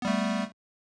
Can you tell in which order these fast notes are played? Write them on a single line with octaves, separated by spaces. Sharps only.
B3 G3 A3